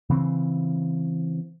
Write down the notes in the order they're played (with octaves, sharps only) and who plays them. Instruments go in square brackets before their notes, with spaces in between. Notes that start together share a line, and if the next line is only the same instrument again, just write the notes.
[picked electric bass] C#3 E3 C4